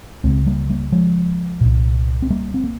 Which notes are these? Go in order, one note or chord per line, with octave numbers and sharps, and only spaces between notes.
C#2 C#3 G#3 C4
G3 A#3
G3 A#3
F3 G#3
C2 A#2
C4
G3 A#3
C4
A#3